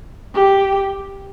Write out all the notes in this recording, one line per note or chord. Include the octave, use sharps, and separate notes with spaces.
G4